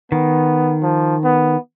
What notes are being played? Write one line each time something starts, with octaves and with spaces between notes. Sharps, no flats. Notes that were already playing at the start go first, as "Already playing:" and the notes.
D#3 B3
F3
B3